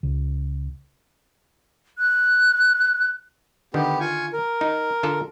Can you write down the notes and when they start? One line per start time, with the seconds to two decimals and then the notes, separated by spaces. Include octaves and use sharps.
0.03 C#2
1.98 F#6
3.74 D3 D#3 B3 G4
4.00 F4 G#5 C#6
4.33 A#4
4.61 D#4
5.03 D3 F4 A4